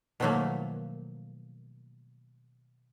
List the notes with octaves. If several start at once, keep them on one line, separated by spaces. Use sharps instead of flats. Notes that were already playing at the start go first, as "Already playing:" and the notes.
B2 D#3 F3 F#3 A3 A#3